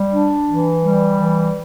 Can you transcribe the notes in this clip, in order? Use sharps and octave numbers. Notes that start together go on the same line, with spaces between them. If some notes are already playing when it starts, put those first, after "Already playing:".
Already playing: G3
D4
E3
G3
E3